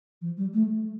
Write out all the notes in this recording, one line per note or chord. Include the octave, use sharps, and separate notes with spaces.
F3
G3
A3